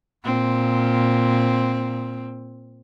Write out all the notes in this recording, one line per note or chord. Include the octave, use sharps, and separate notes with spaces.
A#2 C4